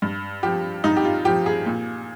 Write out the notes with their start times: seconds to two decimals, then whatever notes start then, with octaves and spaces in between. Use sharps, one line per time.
0.02 G2
0.43 F3 G4
0.84 G2 D#4
0.97 G4
1.05 F4
1.25 F3 G4
1.46 G#4
1.66 A#2